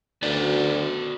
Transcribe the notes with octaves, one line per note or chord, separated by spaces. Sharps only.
D2 F#4 B4 D5